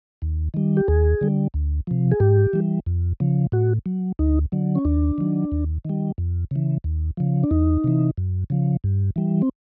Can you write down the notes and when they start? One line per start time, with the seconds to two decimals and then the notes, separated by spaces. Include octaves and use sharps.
0.22 D#2
0.54 D#3 G3
0.77 G4
0.88 D#2 G#4
1.21 D3 G3
1.54 D2
1.87 C3 F3
2.12 G#4
2.20 G#2 G4
2.53 E3 G3
2.86 F2
3.20 C#3 F3
3.52 A2 F#4
3.86 F#3
4.19 D2 D#4
4.52 D3 F#3
4.75 C#4
4.85 D#2 D4
5.18 D#3 F#3
5.52 D#2
5.85 D#3 G3
6.18 F2
6.51 C#3 E3
6.84 D#2
7.17 C#3 F3
7.44 D4
7.51 E2 D#4
7.84 C3 E3
8.17 F#2
8.50 C#3 F3
8.84 G2
9.16 E3 G3
9.42 C4